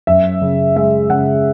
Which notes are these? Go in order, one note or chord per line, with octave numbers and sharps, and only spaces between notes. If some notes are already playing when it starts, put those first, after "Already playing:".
F#2 E5
C#3
G#3 E5
C#3 F#5